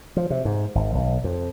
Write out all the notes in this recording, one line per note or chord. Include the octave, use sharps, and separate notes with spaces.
F3
C3
G#2
G#1
B1
F2